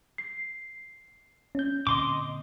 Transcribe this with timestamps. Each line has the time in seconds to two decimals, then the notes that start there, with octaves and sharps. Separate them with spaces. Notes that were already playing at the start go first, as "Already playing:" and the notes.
0.18 C7
1.55 C#4 G6
1.87 A#2 D3 C4 D#5 C6 D6